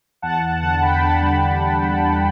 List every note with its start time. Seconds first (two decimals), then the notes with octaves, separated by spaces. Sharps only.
0.22 E2 F#5 A5
0.42 E2 F#5 A5
0.62 D3 F#5 A5
0.82 D3 G5 B5
1.02 D4 F#5 A5
1.22 G3
1.42 D4
1.62 D3
1.82 G3
2.02 D3